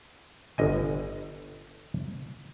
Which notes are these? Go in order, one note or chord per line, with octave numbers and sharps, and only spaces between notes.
G1 D#5 G#5